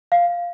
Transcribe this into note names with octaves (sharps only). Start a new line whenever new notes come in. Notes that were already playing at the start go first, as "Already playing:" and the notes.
F5